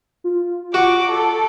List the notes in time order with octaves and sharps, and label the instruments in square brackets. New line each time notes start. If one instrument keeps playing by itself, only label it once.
[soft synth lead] F4
[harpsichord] F#4 [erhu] D6
[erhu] A4